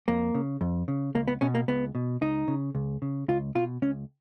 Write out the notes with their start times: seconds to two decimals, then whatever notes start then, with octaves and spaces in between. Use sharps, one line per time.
0.08 F2 A#3
0.34 C#3
0.61 F2
0.88 C#3
1.15 C#2 A#3
1.28 B3
1.41 B2 C#4
1.55 A#3
1.68 C#2 B3
1.95 B2
2.21 C#2 D#4
2.48 C#3
2.75 C#2
3.02 C#3
3.28 C#2 F4
3.55 B2 F4
3.82 C#2 C#4